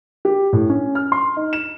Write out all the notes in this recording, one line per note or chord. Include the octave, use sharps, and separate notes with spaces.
G4
A2
C#4
F6
C6
D#4
E7